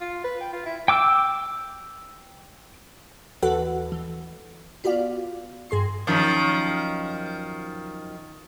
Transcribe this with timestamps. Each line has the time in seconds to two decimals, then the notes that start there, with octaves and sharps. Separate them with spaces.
0.01 F4
0.24 B4
0.40 G5
0.53 F4
0.66 E4
0.88 G5 D6 E6
3.42 D#2 E3 F#4 A4 B4 F#5
3.92 E3
4.84 B3 F4 F#4 D5 F5
5.70 G2 G#4 C6 C7
6.07 F#2 D#3 F3